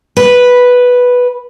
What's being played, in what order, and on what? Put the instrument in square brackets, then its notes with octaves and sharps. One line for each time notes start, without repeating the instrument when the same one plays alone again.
[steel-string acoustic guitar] B4